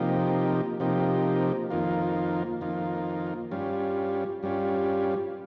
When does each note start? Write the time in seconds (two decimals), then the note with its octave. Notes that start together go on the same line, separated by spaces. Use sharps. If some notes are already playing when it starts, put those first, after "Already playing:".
Already playing: C3 F3 A#3 D#4 G4
0.80 C3 F3 A#3 D#4 G4
1.70 F2 D#3 A#3 F4
2.61 F2 D#3 A#3 F4
3.51 G2 G3 C#4 F4
4.43 G2 G3 C#4 F4